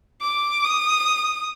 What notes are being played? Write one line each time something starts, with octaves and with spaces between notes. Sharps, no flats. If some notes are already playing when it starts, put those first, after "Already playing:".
D6
D#6